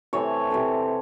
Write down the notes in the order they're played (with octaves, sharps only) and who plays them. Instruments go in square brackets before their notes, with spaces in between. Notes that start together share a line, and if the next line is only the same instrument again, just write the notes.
[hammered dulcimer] C3 E3 A3 C#5
C3 E3 A3